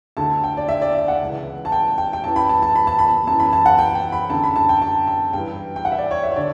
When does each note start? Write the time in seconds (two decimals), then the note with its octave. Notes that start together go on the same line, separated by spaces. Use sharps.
0.17 D2 D3 A5
0.44 G5
0.57 D5
0.69 E5
0.82 D5
0.95 E5
1.08 F#5
1.20 C#2 C#3 E3
1.65 A5
1.72 G5
1.98 G5
2.13 G5
2.24 F#2 E3 A5
2.36 B5
2.49 A5
2.62 A5
2.76 B5
2.87 A5
2.99 B5
3.27 F#2 E3 A5
3.40 B5
3.53 A5
3.66 F#5
3.79 G5
3.95 G5
4.12 B5
4.30 F#2 D3 A5
4.44 B5
4.56 A5
4.69 G5
4.82 A5
5.07 A5
5.33 G2 E3 G5
5.76 G5
5.85 F#5
5.92 E5
5.98 D5
6.11 C#5
6.23 E5
6.31 C#5
6.36 D3 D5